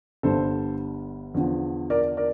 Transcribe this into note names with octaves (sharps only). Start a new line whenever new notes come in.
G1 G2 D3 G3 A4 C5
E2 D3 F3
A#4 D5
A#4 D5